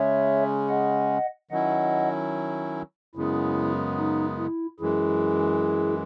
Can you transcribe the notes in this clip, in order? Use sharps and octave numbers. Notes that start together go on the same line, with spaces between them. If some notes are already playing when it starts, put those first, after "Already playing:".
Already playing: C#3 G#3 C#4 C#5 E5
D#5 F#5
D#3 F#3 C#4 E4 D#5 F#5
F#2 C#3 G#3 B3 E4
D#4
E4
F#2 E3 G#3 E4 G#4